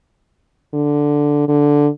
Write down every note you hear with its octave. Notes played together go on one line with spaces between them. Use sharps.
D3
D3